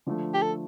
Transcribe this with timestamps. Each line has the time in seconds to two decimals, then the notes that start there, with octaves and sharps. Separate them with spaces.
0.06 D3 F3 A3
0.34 G4
0.42 A4